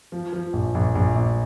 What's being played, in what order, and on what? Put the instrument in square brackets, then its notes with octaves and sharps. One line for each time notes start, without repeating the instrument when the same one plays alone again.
[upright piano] F3
F3
A#1
A#1
A#1
A#1